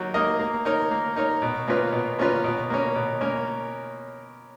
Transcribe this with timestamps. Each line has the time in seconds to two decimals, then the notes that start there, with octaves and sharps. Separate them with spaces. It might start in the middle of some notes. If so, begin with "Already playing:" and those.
Already playing: F#3 A#3 D#4
0.14 A#3 D#4 A#4 D#5
0.40 A#3
0.65 D#4 A#4 C#5
0.91 A#3
1.16 D#4 A#4 C#5
1.42 B2
1.68 A#3 C#4 F4 B4
1.92 B2
2.19 A#3 C#4 F4 B4
2.44 B2
2.70 A#3 C#4
2.95 B2
3.21 A#3 C#4